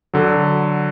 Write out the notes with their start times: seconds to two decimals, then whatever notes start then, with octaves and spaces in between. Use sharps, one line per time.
0.14 D3 F#3